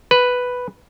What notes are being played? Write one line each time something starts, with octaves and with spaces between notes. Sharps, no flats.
B4